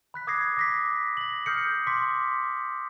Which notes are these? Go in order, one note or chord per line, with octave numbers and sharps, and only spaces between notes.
B5 F#6 B6
D6 D#6 G#6 A#6 C7
D6 A#6 B6
A#6 F#7
D#6 F6 G6 C7 C#7
C6 D6 B6